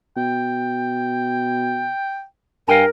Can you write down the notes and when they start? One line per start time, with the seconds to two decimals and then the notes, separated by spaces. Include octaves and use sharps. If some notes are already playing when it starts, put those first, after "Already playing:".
0.17 B2 G5
2.68 G2 A#4 F5 G5 G#5